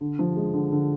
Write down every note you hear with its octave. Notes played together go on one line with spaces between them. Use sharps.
D3
F3
G#3
D3
D3